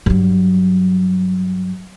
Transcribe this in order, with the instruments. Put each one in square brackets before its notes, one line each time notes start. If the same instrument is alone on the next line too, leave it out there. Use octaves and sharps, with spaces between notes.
[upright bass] G2 F#3